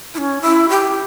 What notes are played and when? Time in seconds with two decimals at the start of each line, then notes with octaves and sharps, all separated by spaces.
0.14 E4
0.18 C#4
0.42 E4
0.69 G4